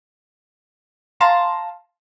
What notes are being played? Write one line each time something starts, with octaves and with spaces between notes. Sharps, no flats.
F5 A5 A#5 C6